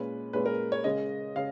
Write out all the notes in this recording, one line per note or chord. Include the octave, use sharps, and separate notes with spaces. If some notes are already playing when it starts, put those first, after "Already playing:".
Already playing: A#2 G#3 C#4 B4
A#2 G#3 C#4 B4
A#4
C#5
C#3 G#3 C#4 D#5
C#3 F5